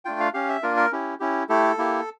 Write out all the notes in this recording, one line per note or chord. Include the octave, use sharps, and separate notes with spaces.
A3 D4 F4 G5
F5
C#4 G4 F5
E5
A#3 D4 F4 A#4
A#4
C#4 E4 G4
C#4 E4 G4
A3 E4 G4 A4
A#3 E4 G4